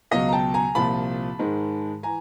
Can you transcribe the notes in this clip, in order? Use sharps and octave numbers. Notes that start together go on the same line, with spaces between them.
C#2 B2 F#3 D#5 F5
A#5
G5 A5
G#5 A#5
C2 A#2 F3 A5 B5
G#2 D#3 G#3
E3 G#5 A#5